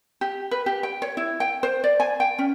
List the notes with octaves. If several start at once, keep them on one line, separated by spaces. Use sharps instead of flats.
G4
B4
G4
G5
C#5
E4
G5
C5
D5
G#5
G5
C#4